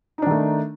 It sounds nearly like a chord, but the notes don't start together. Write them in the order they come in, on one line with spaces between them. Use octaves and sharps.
D#4 D4 D#3 A3